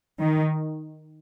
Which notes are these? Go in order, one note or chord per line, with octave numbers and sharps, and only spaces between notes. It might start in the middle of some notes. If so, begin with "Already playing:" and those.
D#3